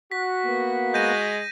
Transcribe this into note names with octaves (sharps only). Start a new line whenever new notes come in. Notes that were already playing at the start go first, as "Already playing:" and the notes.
F#4 B6
A#3 B3
G#3 G6 A#6 D#7